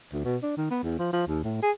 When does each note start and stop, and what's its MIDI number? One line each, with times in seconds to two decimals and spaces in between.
0.13 0.23 38
0.24 0.37 47
0.43 0.57 62
0.57 0.68 51
0.70 0.78 59
0.83 0.97 40
0.99 1.08 53
1.13 1.24 53
1.27 1.44 39
1.44 1.61 45
1.62 1.71 68